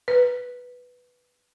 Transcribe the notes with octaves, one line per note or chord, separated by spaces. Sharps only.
B4